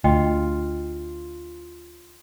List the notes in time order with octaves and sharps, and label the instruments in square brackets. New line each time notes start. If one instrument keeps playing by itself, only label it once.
[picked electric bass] D2 [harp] F4 [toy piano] D#5 G5